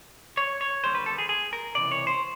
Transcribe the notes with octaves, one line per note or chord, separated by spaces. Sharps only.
C#5
C#5
D#2 D3 G3 C5
B4
A4
G#4
G#4
A#4
C#2 C3 E3 D5
C#5
C5